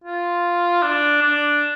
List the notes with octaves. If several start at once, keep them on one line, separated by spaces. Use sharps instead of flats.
F4
D4
D4